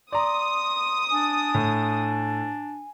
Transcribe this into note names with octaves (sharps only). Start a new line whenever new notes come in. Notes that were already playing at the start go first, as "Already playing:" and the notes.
D5 A#5 C6 D#6
D4 G#5
A2